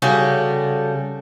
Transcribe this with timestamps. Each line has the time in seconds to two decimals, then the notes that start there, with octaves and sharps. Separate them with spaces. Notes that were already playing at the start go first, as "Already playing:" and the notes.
0.02 C#3 G3 F#4 A4